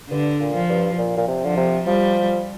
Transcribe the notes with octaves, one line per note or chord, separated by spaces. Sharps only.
G2 D3
A#2
F3
G2
A#2
A#2
C3
D3 F3
C3
F3 G3